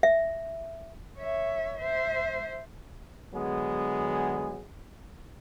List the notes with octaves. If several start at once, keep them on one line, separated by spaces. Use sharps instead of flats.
E5
C#5 E5
C5 E5
D3 F#3 G#3 B3 G#4